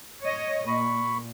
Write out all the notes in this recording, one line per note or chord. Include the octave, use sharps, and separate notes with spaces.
C#5 D#5
A#2 B5 C#6